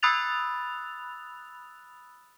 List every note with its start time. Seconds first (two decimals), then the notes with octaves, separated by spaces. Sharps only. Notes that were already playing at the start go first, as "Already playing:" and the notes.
0.03 B5 D#6 E6 F#6 A6 F7